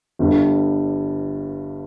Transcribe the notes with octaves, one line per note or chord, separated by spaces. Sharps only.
G1 G2 G3